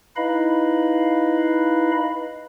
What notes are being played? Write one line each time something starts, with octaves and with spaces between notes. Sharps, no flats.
D#4 E4 B4 D#5 F5 B5